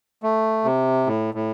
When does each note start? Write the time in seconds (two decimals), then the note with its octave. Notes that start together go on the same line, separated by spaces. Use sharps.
0.23 A3
0.64 C3
1.06 A2
1.34 A2